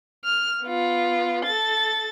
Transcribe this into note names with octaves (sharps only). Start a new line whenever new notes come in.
F6
B3 F4
A4 A6